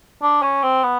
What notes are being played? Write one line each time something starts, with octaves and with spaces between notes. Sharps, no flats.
D4
C#4
C4
B3